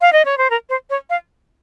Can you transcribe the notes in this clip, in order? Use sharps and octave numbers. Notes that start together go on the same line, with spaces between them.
F5
D#5
C#5
C5
A#4
C5
C#5
F5